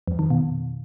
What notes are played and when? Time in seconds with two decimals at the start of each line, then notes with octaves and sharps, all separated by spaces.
0.08 F2
0.19 D#3
0.30 B2